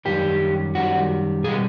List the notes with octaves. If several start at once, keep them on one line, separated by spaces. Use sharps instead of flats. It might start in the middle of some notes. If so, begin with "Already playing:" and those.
F#2 D#3 G3 G4
F#2 D#3 G3 F#4
B2 G3 G#4